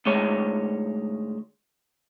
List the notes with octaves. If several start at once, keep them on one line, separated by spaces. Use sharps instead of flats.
D2 G#2 G#3 C#5